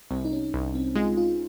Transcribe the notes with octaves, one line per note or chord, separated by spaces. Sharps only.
C2 C4
D#4
C#4
C2
C4
G#3 F4
F4